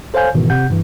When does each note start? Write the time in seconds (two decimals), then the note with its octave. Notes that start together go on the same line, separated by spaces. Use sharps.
0.14 A4 C5 C#5 F5 G#5 G6
0.34 G#2 B2 D#3 E3
0.50 C3 F#5 G6
0.70 G2 E3